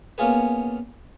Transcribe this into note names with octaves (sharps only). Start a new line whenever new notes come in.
A#3 B3 C#4 F4 G#4 B4